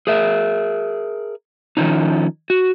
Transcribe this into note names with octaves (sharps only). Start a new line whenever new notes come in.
G#4 A#4 E5
D#3 F3 C#4 D#4
F#4